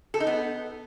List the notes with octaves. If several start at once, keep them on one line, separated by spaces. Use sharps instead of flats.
A4
D#4
B3